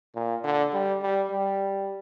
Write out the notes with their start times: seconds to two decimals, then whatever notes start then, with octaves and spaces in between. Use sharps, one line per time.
0.15 A#2
0.44 D3
0.73 G3
1.02 G3
1.30 G3